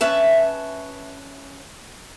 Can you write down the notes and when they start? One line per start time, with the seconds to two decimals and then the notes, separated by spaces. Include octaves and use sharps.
0.01 C#4 B4 E5 A5